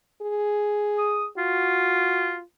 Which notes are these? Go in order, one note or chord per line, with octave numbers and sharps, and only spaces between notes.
G#4
D#6
F4 F#4